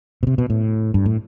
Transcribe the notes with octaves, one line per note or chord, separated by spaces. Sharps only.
B2
C3
B2
A2
G2
A2